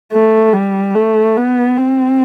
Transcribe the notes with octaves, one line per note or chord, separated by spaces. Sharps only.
A3
G3
A3
B3
C4